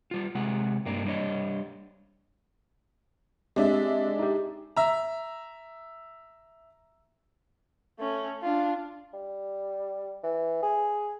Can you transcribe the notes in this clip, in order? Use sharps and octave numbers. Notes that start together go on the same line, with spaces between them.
G3 F4
C3 G#3 F#5
G2 A#3 D4
G3 D4 F#4 C#5 D#5
G#3 C4 D4 G4 E5
D#4 G4
E5 A#5
A3 C#4
D4 F4
G3
E3
G#4